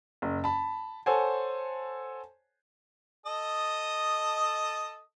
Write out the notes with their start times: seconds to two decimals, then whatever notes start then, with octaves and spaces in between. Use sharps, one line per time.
0.22 F#1
0.44 A5 B5
1.06 A4 C5 C#5 F#5 G#5
3.26 A4 D#5 D#6